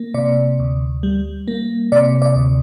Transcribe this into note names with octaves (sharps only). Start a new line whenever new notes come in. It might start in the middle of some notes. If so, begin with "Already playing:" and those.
Already playing: A#3
C3 D5
D2
G3
A#3
C3 D5
D5
D2